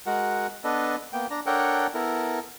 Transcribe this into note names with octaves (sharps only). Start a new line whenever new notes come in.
G#3 F#4 A#4 F#5
B3 D4 A4 B4 D#5
A#3 B3 G5
D4 A#5
D4 A4 A#4 C#5 F#5 G5
B3 E4 A4 A#4